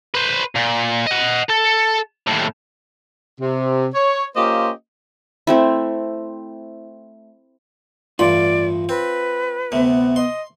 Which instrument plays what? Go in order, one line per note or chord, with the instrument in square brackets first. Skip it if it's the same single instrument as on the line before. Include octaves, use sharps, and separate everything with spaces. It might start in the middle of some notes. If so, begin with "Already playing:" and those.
[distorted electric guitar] B4 C5
A#2
D#5 F#5
A4
D#2 A2
[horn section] C3
C#5
A#3 C#4 F4 G4 C5 D#5
[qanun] A3 C4 E4
[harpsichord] A1 G2 B5 [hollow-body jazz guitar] F4 [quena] D5
[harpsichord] C4 [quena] B4
[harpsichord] D2 C3 [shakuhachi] B3
[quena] D#5 [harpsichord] C6